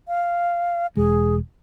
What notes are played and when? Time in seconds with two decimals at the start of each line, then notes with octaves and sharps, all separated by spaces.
0.08 F5
0.97 E1 G#3 G#4